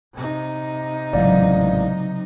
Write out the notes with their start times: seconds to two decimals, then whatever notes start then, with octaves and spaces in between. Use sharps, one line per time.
0.14 C3 D#4
1.13 A1 G#2 C#3 E3 F#3 D5 F5